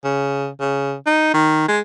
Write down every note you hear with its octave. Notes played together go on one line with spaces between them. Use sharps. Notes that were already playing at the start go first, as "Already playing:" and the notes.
C#3
C#3
D#4
D#3
G#3